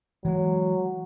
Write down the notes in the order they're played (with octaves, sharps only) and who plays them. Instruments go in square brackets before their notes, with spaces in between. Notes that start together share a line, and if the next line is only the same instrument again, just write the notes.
[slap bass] E3 G#3 [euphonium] F#3